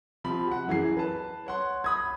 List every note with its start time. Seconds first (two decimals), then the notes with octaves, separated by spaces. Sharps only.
0.24 C3 F3 B5
0.47 F#4 F#5
0.68 F#2 E3 G#4 C7
0.97 B4 A5
1.46 C#5 F#5 C6
1.84 B5 D#6 G#6